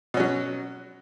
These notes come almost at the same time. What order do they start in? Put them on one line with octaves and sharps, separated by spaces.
B2 C#4 F#3